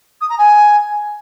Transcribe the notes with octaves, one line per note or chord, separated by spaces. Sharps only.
D#6
A#5
G#5